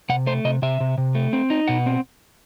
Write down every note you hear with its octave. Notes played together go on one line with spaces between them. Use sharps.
C3 F#5
A3 C5
C3 D#5
C3 E5
C3
C3
A3
C4
D#4
B2 F#5
C4